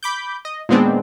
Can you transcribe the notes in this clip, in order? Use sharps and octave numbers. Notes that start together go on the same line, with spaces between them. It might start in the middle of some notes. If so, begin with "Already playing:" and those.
B5 D6 G6
D#5
A#2 D#3 G#3 B3 C4 D4